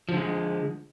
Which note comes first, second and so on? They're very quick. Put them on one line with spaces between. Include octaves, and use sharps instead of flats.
F3 D3 G#3